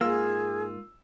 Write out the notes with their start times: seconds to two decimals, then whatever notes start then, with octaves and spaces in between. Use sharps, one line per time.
0.01 G#2 A#3 F4 G#4 E6